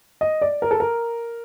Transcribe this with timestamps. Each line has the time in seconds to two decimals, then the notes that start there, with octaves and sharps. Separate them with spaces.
0.21 D#5
0.42 D5
0.62 A#4
0.71 A4
0.80 A#4